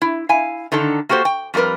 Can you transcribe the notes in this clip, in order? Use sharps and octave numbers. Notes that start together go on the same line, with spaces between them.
E4
E4 F5 G#5
D3 D#3 D#4 A4
A#3 F#4 G4 A4 C5
G5
F2 G3 A3 A#4 B4